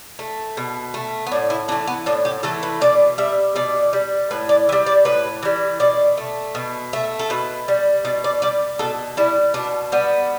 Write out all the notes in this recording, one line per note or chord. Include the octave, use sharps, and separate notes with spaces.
A3
B2
A3
B3
A2 D4
E4
E3 A3 D4
B3
A2 D4
G4
E3 A3 A4
B4
B2 D5
G3 E5
B2 D5
G3
A2 B4
D5
E3 E5
G3
D5
A2 B4
E3 G3
B2 D5
A3
B2
A3 E5
A4
B2 B4
G3
B2 D5
D5
G3 D5
B2 A4
G3 E4
B2 D4
G3 B3